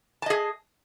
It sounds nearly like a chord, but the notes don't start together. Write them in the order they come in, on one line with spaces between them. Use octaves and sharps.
A5 D#5 G#4